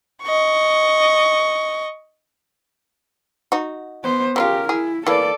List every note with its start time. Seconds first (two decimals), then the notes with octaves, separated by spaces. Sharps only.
0.23 D#5 C#6
3.52 D#4 F#4
4.03 B3 C5
4.36 C#3 C4 F4 G4 A#4
4.69 E4 G#4
5.07 E3 A#3 A4 D5